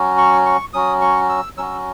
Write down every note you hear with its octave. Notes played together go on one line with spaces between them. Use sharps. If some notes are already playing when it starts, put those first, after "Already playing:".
Already playing: F#3 C#4 F#4
C#6
C#6
F#3 C#4 F#4 D#6
C#6
E6
F#3 C#4 F#4 E6